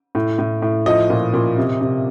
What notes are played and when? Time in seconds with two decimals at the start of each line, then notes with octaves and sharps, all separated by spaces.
0.15 A2
0.39 A2
0.62 A2
0.86 F3 D#5
1.10 A#2
1.34 A#2
1.57 C3
1.81 C3